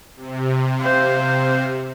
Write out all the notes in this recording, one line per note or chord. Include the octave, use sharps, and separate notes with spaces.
C3
C5 F5